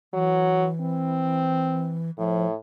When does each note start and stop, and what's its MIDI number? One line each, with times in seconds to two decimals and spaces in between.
0.14 2.11 52
0.14 0.67 54
0.81 2.02 60
2.18 2.54 45
2.18 2.46 53